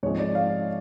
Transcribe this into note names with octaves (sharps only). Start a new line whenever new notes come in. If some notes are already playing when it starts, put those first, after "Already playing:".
G#2 F3 G#3 C4 C#5
D5
F5